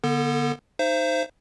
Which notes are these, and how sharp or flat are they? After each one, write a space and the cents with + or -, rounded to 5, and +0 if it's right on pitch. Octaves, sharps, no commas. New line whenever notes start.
D3 -15 B3 -30 A4 +35
D#4 -5 C5 +0 E5 +45